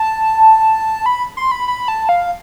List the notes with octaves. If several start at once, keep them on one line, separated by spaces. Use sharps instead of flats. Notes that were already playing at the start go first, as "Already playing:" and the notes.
Already playing: A5
B5
C6
B5
B5
A5
F5